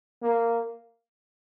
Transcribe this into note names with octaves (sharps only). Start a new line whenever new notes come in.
A#3